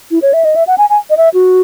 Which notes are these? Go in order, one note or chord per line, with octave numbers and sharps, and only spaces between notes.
E4
C#5
E5
D#5
E5
F#5
G#5
G#5
D#5
E5
F#4